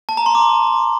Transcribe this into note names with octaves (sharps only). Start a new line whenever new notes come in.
A5
A#5
C6
D6